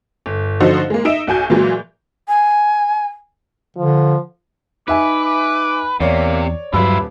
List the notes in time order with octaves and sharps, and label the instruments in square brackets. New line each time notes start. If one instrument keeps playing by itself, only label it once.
[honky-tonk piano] G1
D3 F3 D#4 F#4 C5
G#3 A#3
D#4 E5 D7 E7
B1 F#4 G#5 G6
A#2 E3 F#3 G#3
[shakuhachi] G#5
[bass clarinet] D3 [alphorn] F3
[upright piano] D#4 E5 G#5 [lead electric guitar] B4 [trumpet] D6
[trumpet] D6
[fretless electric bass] E2 [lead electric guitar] C3 [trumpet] A#3 [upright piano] C#5 D5
[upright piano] D#1 B4 E6 [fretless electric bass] G2 F#3 [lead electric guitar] E4 F4 [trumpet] B5